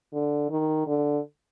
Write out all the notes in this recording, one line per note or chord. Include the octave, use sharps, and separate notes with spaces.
D3
D#3
D3